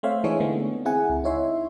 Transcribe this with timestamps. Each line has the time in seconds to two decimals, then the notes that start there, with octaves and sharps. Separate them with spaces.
0.03 A3 C4 C5 C#5 E5 F5
0.24 E3 G#3 D4 D#4 G#4 C#5
0.40 D3 A3 B3 C4
0.85 C4 E4 G#4 F#5 G#5
1.09 C#2
1.24 D#4 E4 C#5 E5 C6